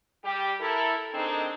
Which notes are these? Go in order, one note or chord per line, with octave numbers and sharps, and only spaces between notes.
G3 G4
E4 A4 A#4
D#3 G#3 C4 D4 D#4